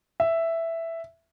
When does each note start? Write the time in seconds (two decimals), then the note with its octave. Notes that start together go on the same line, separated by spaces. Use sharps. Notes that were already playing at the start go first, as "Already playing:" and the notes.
0.20 E5